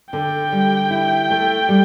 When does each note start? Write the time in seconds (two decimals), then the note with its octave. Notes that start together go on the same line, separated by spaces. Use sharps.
0.13 D3 G5
0.52 G3
0.91 E4
1.31 A3
1.69 G3